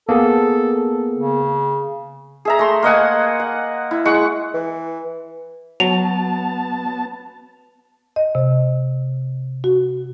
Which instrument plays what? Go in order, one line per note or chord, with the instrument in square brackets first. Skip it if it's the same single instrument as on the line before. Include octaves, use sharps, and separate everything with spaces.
[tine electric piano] A#3 B3 G#4 [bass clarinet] A4
[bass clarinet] C#3
[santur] G#4 E5 A#5
A3 C6
A#3 D#5 F#5 G#5
F#5
E4
G#3 F#5 C#6
[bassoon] E3
[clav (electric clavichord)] F#3 [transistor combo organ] B3 A5 [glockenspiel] F7
[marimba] D#5
C3
F#4